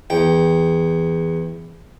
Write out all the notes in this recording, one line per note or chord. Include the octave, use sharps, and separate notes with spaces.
E2 G5